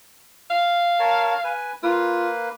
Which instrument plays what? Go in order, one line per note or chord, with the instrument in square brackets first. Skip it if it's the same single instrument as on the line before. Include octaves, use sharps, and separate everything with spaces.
[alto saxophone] F5
[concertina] A#4 C#5 A5
B4 G#5
[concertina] A#3 B4 [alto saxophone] F4